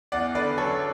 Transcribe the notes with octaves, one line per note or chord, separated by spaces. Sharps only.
E2 D5 F#5
D3 B4 D5
F#3 A4 C#5